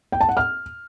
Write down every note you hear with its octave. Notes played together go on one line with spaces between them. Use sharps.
G5
A5
F#5
F6